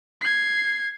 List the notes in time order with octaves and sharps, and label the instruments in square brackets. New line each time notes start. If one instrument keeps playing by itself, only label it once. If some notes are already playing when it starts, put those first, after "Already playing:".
[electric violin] G#6 C7